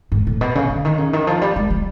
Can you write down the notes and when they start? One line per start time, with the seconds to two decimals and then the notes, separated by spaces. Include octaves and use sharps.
0.12 G#2
0.27 A2
0.41 B2
0.55 C#3
0.69 D3
0.85 D#3
0.98 C#3
1.13 D#3
1.27 F3
1.42 G3
1.56 G#3
1.70 G3